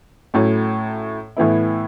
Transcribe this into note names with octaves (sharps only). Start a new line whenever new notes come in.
A2 F#3 A3 C#4 E4
A2 E3 B3 E4